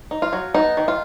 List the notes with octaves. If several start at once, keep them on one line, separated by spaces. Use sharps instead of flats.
D#4
F4
F#3
B3 D#4
D#3
F4